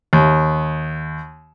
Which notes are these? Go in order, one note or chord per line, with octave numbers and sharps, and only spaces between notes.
D#2